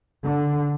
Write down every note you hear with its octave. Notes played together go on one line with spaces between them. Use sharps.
D3